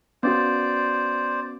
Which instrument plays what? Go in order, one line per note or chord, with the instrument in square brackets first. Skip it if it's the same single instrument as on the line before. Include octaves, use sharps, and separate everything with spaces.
[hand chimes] B3 C#4 F#4 [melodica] C5 D5